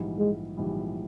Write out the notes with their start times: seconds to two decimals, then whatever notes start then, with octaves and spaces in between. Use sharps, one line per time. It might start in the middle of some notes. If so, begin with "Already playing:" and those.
Already playing: A#1 G#2 E3 G3
0.19 G#3
0.57 A#1 G#2 E3 G3